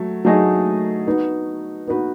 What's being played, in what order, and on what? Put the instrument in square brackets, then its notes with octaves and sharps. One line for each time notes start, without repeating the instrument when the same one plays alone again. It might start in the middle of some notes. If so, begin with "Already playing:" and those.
Already playing: [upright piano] F#3 A3
F#3 A3 D#4 G#4 D#5
B3 D#4 F#4 B4
B3 D#4 F#4 B4